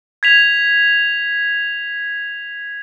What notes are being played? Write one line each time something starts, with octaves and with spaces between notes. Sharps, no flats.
G#6 B6 F7